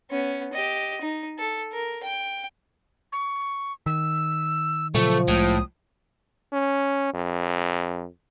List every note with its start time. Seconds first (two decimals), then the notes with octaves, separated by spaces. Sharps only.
0.11 B3 C#4
0.53 G4 D#5
1.01 D#4
1.38 A4
1.72 A#4
2.03 G5
3.12 C#6
3.86 D#3 E6
4.95 A#2 C#3 F3 F#3 A3 C#6
5.28 C2 A2 G#3 D#6
6.53 C#4
7.14 F2